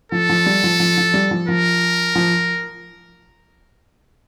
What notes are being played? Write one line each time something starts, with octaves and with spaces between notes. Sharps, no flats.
F3 A4
F3
G3
F3
F3
F3
G3
F3
F3 A#4
F3